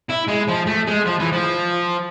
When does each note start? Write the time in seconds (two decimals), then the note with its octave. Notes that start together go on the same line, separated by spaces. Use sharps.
0.10 E4
0.28 G#3
0.48 F3
0.67 A3
0.88 G#3
1.06 F3
1.20 E3
1.32 F3